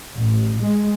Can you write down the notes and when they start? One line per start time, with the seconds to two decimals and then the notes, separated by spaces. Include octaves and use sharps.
0.15 A1
0.60 G#3